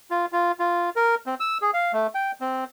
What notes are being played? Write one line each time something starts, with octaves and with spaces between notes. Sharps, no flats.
F4
F4
F4
A#4
C4
E6
G#4
F5
A3
G5
C4